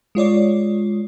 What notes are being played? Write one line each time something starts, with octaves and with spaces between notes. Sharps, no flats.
G#3 F4 C#5 D5